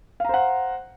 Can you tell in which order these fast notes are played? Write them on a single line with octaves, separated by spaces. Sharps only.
F5 A#5 C5 F#5